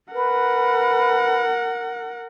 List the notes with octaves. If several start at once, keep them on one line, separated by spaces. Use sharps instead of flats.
A#4 B4 F#5